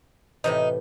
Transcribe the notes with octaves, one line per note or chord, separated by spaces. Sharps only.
A2 C3 E3 D#4